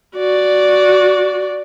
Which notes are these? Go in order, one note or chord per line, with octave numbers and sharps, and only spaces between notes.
F#4 D5